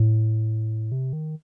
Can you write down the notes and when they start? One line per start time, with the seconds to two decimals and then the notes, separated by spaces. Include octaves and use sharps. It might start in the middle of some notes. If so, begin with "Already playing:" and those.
Already playing: A2
0.92 C3
1.13 D#3